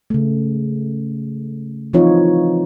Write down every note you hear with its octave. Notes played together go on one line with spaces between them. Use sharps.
C#3 A3
E3 F3 C4 D#4 F4 C#5